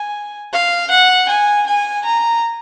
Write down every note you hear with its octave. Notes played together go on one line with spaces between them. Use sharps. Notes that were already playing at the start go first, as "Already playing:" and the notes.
Already playing: G#5
F5
F#5
G#5
G#5
A#5